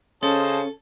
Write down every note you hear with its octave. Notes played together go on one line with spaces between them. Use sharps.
C#3 C#4 A4 C5 D#5 A5